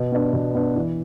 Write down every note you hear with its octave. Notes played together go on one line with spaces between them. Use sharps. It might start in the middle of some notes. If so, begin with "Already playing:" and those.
Already playing: B2
B3 D4
B2
B3 D4
E3